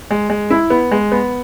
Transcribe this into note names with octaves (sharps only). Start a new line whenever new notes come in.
G#3
G#3
E4
B3
G#3
B3